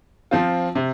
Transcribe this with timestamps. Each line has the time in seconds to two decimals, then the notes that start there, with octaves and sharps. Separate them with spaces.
0.31 F3 C4 F4
0.75 C3